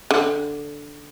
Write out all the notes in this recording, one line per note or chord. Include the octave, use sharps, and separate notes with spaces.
D3